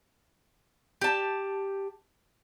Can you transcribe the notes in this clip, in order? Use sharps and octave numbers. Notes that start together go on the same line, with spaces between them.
G4 A5